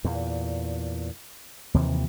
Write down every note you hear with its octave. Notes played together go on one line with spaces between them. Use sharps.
E2 A#2
D#2 C3 E3 F3